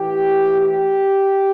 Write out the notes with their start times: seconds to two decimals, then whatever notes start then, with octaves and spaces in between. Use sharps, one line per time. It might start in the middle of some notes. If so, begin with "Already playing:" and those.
Already playing: A2 E3 G4
0.59 G4